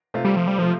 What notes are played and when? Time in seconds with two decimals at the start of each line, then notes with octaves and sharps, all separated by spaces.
0.14 C3 A3 C4 F4
0.25 G3
0.37 F3
0.47 G3
0.58 C3 F3 A3 F4